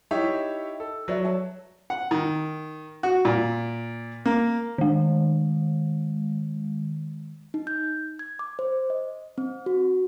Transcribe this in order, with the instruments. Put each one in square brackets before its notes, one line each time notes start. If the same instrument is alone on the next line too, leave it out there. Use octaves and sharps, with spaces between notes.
[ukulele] D#4 E4 [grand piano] G4 C#5 E5
[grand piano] A4
[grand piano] F#3 [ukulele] B4 D5 E5
[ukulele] A4 C#5 A5
[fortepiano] F#5
D#3
F#4
A#2
A#3
[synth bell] D#3 G#3
[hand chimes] D#4
G6
G#6
D6
C5
D#5
C4
F#4